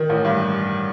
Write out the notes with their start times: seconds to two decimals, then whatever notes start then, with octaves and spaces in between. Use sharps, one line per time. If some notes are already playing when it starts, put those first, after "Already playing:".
Already playing: D#3
0.09 A1
0.25 G2